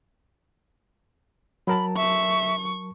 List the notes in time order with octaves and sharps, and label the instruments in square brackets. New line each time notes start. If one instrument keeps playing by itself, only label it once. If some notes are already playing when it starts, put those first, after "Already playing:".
[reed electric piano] F#3 A#4 A5 [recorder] B5
[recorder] E5 [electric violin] C#6